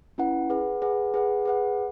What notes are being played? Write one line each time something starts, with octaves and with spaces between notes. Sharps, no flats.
C#4 E4 B4 F#5
G#4 B4 F#5
G#4 B4 F#5
G#4 B4 F#5
G#4 B4 F#5